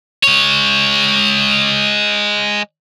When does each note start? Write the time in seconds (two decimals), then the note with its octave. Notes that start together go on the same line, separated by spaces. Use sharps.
0.23 G#3 C#5